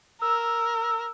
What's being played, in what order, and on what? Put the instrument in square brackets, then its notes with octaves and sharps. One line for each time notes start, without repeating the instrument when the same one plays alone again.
[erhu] A#4 [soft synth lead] E6